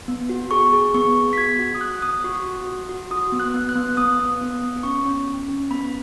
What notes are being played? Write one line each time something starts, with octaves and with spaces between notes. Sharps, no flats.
B3
F#4
G#4 C#6
G#4
B3 C#6
G#4
B6
F#4 G#6
F#4
D#6
F#4 F#6
B3 D#6
F#4 C#6
F#4
F#4
F#4
F#4 D#6
B3
F#6
B3
F#6
B3
B3 D#6
B3
B3
B3
C#4 C#6
C#4
C#4
C#4
B3 B5